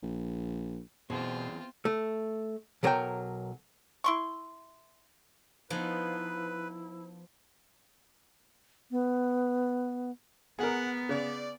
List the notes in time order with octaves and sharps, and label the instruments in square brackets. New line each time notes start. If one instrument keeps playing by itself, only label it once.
[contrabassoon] A#1
[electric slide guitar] E2 G#4 C5 [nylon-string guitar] B2 [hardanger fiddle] C4 F4
[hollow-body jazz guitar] A3
B1 F#3 A#4 C#5 D5 G5
[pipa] E4 C6 C#6
[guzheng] F3 [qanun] B3 D#4 G#5 [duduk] E4 [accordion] B4
[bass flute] B3
[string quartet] B3 [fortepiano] G#4 A#4 [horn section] F#5
[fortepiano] C#3 [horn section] D5